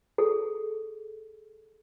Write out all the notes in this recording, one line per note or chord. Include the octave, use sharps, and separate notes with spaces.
G#4 A4